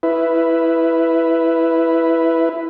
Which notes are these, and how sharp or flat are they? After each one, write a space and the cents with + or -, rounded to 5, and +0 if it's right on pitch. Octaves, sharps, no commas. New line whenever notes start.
E4 +0 B4 +5